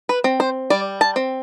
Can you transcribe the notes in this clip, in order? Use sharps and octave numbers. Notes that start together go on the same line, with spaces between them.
B4
C4
C5
G3 D5
A5
C4